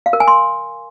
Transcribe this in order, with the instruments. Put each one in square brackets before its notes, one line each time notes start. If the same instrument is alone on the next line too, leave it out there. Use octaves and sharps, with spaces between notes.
[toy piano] F5
A#4
G#5
C6